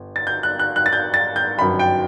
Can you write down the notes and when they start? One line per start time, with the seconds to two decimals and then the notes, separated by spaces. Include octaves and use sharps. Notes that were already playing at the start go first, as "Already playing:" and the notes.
Already playing: G1
0.16 A6
0.27 G6
0.43 F#6
0.59 F#6
0.76 F#6
0.86 A6
0.93 G6
1.14 A6
1.36 G6
1.58 G1 F#2 D#3 B5
1.79 G5